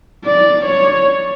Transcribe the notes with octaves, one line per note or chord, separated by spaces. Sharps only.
D5
C#5